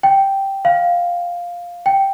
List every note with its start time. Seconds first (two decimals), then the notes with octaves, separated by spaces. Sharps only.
0.03 G5
0.65 F5
1.86 G5